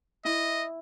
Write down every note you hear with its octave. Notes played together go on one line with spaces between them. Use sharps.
E4 D#5